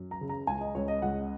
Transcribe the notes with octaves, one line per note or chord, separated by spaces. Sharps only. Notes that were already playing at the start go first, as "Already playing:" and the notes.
Already playing: F#2
A#5
C#3
A#5
C#2 G#5
D#5
C#2 C#5
D#5
C#2 F#5